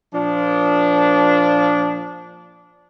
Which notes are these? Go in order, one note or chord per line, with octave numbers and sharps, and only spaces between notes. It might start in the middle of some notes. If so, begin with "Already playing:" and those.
A#2 F3 D4